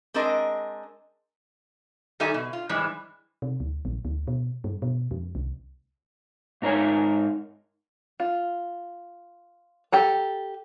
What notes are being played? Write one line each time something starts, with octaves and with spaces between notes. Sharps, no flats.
G#3 C4 D4 A#4 D#5
D#3 G3 D#4 A4 E5 G#5
B2
F4
G#2 E3 G3 G#3
C3
D2
A#1
D2
B2
G2
B2
F2
C2
G#2 D#4 A#4 C#5 G#5
F4
G4 A4 A#5